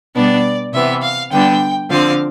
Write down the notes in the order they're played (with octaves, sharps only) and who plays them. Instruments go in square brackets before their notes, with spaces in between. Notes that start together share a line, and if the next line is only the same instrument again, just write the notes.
[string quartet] B2 G3 B3 D4 D5
C3 E3 B3 E5
F5
D3 G3 B3 D4 G5
D3 F3 C4 F5